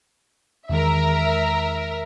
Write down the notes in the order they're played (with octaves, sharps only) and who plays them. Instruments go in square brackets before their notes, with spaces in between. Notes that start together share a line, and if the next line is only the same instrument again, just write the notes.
[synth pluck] E2 D#3 G#3 [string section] A#4 E5